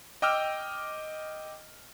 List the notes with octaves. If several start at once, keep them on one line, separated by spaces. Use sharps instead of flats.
D#5 G5 D6 E6 F6